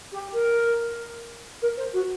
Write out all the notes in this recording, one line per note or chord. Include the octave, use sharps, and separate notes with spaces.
G4
A#4
A#4
C5
F#4